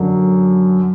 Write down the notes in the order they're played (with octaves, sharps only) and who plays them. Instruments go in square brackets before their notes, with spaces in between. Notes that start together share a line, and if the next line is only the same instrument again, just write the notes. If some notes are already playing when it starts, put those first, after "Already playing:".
Already playing: [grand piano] F#2 D3 F#3